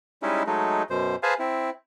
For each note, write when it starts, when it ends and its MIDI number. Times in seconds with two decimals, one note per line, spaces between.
0.22 0.43 55
0.22 0.43 56
0.22 0.43 61
0.22 0.43 63
0.22 0.43 64
0.47 0.83 54
0.47 0.83 56
0.47 0.83 57
0.47 0.83 63
0.90 1.16 42
0.90 1.16 47
0.90 1.16 72
1.23 1.34 68
1.23 1.34 71
1.23 1.34 72
1.23 1.34 77
1.23 1.34 80
1.23 1.34 81
1.39 1.70 60
1.39 1.70 64